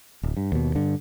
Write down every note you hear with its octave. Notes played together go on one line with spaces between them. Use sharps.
D1
G2
D#2 B2
G2 D3